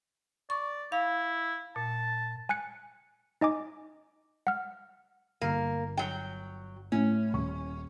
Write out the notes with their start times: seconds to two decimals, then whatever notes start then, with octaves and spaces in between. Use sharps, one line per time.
0.50 D5 C#6
0.92 E4 F5
1.76 A#2 A5
2.49 G#5 F#6 C#7
3.41 D#4 D#5 G#5 D6
4.47 F#5 F6
5.41 G1 A#3
5.97 F#3 G5
6.92 A2 C#4
7.33 D#1 C#6